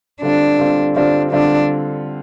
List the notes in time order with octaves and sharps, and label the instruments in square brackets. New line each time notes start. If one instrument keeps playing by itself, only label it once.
[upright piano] D3 G3 C4 F4 [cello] D4
[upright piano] D3 G3 C4 F4
[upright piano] D3 G3 C4 F4 [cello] D4
[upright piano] D3 G3 C4 F4 [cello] D4